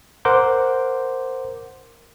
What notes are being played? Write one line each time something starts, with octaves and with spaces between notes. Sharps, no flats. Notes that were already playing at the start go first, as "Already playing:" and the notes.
A#4 C5 F#5 C6 D6 G6